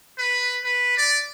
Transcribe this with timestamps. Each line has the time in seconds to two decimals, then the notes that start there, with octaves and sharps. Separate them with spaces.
0.19 B4
0.64 B4
0.98 D5